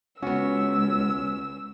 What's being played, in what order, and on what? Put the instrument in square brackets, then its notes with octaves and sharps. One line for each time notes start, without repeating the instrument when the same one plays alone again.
[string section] C#2 [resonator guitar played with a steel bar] B3 F#4 [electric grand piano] C#4 [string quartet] E6